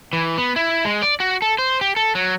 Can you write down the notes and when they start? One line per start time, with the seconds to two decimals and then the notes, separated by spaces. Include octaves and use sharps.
0.13 E3
0.38 B3
0.56 E4
0.85 G#3
1.02 D5
1.20 F#4
1.42 A4
1.59 C5
1.81 G4
1.96 A4
2.15 F#3